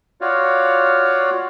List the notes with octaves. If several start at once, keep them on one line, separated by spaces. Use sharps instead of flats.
F4 F#4 C#5 D5 F5